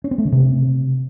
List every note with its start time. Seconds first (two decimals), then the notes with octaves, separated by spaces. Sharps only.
0.04 C#4
0.11 C4
0.18 A3
0.25 D3
0.32 C3